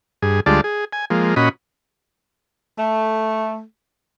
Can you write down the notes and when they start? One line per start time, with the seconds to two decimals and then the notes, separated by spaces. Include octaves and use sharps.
0.22 G2 G#4
0.46 D2 G3 G#3 F4 D5 A5
0.64 G#4
0.93 G#5
1.10 F3 G#3 A#3
1.36 A#2 C#4 F#4 D#5 B5
2.78 A3